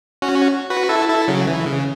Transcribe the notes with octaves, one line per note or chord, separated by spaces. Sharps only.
C#4 F#4
F#4 B4
E4 A4
E4 A4
C#3 F#3
E3
C#3